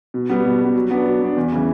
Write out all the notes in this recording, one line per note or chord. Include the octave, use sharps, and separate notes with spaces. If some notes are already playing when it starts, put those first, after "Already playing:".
B2
G3 B3
B2
G3 B3
F#3
B3 D4
F#3
B3 D4
E2
C#3 E3